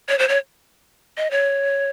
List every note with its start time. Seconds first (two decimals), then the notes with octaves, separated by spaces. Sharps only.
0.09 C#5
0.19 C5
0.29 C#5
1.18 D#5
1.31 C#5